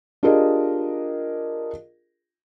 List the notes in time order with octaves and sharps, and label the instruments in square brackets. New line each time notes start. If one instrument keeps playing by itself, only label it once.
[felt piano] D4 F4 G4 G#4 A#4 D#5